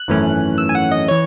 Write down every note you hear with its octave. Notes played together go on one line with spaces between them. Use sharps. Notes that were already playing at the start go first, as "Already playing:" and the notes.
Already playing: F#6
G#1 F#2 E3 A3 C#4
E6
G#5
F#5
D#5
E3 C#5